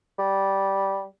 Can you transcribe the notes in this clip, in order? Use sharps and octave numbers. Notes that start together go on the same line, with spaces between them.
G3